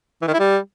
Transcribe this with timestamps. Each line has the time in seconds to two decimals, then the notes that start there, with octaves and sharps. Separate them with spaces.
0.22 E3
0.28 D#3
0.34 E4
0.39 G3